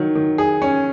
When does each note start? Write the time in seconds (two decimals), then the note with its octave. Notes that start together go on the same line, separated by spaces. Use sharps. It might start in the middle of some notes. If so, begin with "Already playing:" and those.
Already playing: D#3 F#3
0.15 D#3
0.38 G#4
0.62 C#4